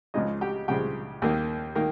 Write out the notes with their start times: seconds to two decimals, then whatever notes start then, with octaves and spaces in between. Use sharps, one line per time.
0.14 C#2 C#3 F3 G#3 D#4 D#5
0.41 G4 G5
0.68 C#2 C#3 F3 G#3 G4 G5
1.22 D#2 D#3 A#3
1.75 D#3 A#3